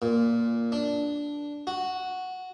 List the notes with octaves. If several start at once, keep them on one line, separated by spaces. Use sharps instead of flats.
A#2
D4
F#4